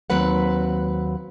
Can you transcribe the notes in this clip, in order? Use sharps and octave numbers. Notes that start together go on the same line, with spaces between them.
D#2 F#3 C4 B4 F#5